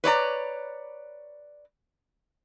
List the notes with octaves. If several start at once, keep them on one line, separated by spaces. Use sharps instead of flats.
B4 C#5 D5 A#5